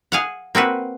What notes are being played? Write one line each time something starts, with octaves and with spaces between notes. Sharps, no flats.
G#4 F5 F#5
A#3 C4 F#4 B4